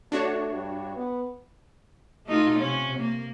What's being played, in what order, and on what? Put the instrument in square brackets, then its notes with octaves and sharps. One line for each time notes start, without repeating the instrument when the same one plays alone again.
[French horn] A3 [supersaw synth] D4 F#4 C#5
[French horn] G2
B3
[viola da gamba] A3 D#4 F4
C3 C#4
A#3